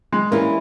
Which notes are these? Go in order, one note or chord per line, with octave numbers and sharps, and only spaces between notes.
G#3
E3 G3 A#3 C#4 E4